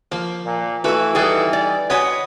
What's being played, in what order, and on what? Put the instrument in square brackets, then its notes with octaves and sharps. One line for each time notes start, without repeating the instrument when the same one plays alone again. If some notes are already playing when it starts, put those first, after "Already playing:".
[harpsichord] F3 [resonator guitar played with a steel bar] A#3
[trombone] A#2
[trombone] E3 [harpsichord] A3 B4 [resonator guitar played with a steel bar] F#4 E5
[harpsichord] G3 D#4 [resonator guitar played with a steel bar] G#4 A4 F#5
[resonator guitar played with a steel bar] D5
[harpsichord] F#4 C#5 D#5 [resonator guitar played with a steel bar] B4 F#5 G#5